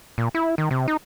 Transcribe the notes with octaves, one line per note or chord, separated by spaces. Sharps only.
A#2
E4
D#3
C3
D#4